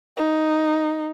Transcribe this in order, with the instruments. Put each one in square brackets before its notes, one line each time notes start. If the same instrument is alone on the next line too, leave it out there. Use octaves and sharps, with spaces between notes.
[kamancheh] D#4